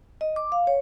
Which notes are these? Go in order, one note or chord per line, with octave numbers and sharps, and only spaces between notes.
D#5
D6
F5
C#5